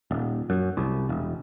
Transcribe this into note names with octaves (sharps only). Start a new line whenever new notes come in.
D#1
F#2
C2
E1